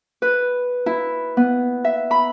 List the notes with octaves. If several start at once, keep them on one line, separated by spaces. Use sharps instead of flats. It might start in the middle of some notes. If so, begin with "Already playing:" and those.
B4
E4
B3
E5
B5